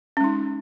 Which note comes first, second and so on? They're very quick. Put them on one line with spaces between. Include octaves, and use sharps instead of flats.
C#4 G#3 D#4